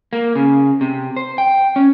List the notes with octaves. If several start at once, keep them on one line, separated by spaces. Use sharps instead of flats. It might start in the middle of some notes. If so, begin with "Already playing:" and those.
A#3
C#3
C3
C5
G5
C#4